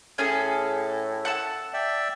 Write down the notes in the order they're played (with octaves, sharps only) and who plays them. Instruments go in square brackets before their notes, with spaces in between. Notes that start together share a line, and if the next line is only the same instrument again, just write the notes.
[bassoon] A2 [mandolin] C#4 G#4 A4
[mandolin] F#5 A5 E6
[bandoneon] D5 E5 G5